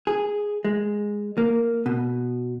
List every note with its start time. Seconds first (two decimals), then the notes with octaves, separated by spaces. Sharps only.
0.07 G#4
0.65 G#3
1.38 A#3
1.86 B2